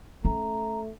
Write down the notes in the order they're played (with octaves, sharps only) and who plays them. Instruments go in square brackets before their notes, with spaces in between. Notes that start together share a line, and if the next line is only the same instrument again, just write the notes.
[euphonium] A3 [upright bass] C#4 [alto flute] A#5